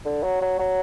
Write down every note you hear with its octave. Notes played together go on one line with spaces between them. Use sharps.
D3
F#3
F#3
F#3